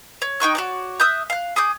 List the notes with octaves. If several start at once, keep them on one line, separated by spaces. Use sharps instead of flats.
C#5
D#4 G5 C#6 F#6
F#4 C#5 D5
E5 D#6 F#6 G6
F5 F#6
G#4 D6 D#6 G6